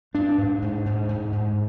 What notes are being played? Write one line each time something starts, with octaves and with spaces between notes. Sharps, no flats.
G#2 D4
G#2
G#2
G#2
G#2
G#2